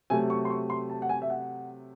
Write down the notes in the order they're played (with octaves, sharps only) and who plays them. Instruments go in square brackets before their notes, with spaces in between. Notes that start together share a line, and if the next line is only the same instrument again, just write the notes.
[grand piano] C3 F#3 A3 G#5
C#6
C6
C#6
C6
A5
F#5
G#5
E5
F#5